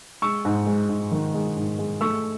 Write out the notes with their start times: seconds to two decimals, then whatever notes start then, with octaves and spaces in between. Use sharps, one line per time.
0.22 G#3 C#6 E6
0.45 G#2
0.67 G#3
0.89 G#2
1.11 D#3
1.34 G#3
1.57 G#2
1.78 G#3
2.01 A3 C#6 E6